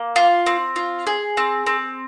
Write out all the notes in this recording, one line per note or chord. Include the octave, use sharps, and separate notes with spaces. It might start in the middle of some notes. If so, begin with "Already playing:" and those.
Already playing: A#3
F4
C4
F4
G#4
C4
C4